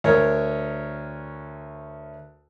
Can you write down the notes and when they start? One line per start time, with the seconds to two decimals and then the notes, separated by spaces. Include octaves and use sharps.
0.04 D2 A#4 C#5